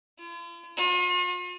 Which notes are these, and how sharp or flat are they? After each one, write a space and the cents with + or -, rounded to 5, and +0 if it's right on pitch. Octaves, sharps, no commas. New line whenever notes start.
F4 -45
F4 +45